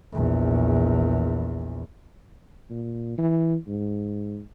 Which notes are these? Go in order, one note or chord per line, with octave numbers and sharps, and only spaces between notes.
A#1 E2
A#2
E3
G#2